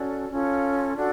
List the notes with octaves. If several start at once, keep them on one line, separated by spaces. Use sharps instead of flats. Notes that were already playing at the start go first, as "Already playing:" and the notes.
Already playing: C#4 F#4 A4 D5
C#4 F4 A4
D4 F#4 A4